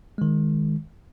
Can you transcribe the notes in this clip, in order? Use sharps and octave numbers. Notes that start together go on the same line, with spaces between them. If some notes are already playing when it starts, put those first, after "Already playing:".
D#3 G#3